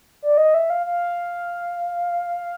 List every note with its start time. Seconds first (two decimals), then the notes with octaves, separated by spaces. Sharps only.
0.22 D5
0.38 D#5
0.54 E5
0.70 F5
0.86 F5